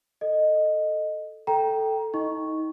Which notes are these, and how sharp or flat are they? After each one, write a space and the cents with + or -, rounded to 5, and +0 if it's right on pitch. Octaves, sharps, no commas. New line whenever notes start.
A4 +0 D#5 -10
A4 +0 G5 -5 A#5 +15
D#4 +30 D#5 +0 C#6 +0